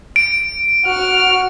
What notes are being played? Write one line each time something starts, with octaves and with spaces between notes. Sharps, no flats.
D7
F#4 F6